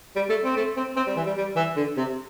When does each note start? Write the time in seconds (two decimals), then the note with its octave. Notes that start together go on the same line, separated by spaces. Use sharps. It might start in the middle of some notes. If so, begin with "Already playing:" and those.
0.16 G3
0.29 A3
0.44 C4
0.56 A3
0.76 C4
0.96 C4
1.07 G3
1.16 E3
1.26 G3
1.37 G3
1.56 E3
1.76 D3
1.97 C3